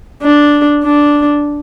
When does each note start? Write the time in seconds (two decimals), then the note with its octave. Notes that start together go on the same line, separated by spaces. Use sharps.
0.23 D4
0.84 D4